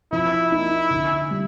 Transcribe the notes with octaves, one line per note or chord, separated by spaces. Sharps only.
F3 E4
A#3 D#4
D3
G3